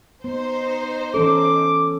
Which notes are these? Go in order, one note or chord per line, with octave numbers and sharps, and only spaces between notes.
B3 D#4 C5
E3 C#4 A4 D6